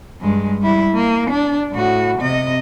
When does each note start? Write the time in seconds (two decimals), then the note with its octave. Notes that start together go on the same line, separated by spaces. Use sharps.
0.21 G2 G#3
0.61 G3 E4
0.94 A#3
1.30 D4
1.72 A2 F#4
2.19 C3 D#5